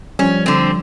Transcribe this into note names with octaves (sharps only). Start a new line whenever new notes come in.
F3 G3 C#4
D3 C4